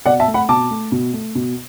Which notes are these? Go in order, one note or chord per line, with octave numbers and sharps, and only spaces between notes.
B2 D5 F#5
E5 A5
A3
F#5 B5
B2 A5 D6
A3
B2
A3
B2